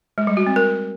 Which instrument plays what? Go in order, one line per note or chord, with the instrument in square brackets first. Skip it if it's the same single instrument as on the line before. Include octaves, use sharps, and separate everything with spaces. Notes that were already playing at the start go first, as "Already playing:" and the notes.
[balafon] G#3
G3
F#4
C4
A#4